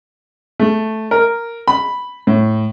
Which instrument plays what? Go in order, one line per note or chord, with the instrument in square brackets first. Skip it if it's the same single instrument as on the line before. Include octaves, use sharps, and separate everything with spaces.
[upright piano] A3
A#4
B5
A2